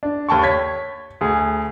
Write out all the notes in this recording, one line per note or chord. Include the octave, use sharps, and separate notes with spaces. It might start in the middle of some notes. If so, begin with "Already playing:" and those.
D4
D#2 G5 A5 C#6
C#5 G#6 B6
D2 G#4